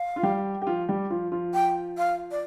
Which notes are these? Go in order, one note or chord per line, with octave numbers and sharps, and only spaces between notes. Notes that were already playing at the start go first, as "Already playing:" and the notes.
Already playing: F5
F4
G3 G4
G4
F3 F4
G3 G4
F3 F4
F3 F4
G5
F5
D5